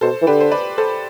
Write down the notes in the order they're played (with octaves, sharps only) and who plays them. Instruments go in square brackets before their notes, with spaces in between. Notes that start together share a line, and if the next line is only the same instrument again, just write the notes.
[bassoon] B2 [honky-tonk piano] A4 C5
[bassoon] E3
[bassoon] D3 [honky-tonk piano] G4 B4
[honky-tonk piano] C5
B4 D5
A4 C5